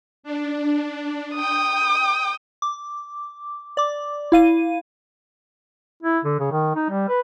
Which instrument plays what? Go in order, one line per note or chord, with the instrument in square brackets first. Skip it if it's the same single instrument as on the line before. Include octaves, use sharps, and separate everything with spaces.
[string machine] D4
[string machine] G5 [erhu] D#6
[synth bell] D6
D5 D6
E4 F5 D#7
[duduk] E4
D3
C#3
D#3
D#4
G3
B4